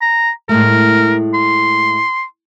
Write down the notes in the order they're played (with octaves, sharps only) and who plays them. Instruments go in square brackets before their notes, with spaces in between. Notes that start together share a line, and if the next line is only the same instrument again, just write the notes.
[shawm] A#5
[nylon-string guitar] A2 G#3 A3 [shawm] A#4
[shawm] C6